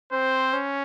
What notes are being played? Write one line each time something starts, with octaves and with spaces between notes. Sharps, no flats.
C4 C5
C#4